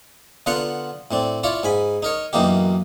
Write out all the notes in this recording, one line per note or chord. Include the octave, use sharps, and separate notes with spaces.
D3 B3 F4 F#5 A#5 C6
A2 C4 D4
E4 F4 C#5 D5
G#2 G#5 B5
D#4 A#4 C#5
B1 F#2 E3 A#3 D#4 G4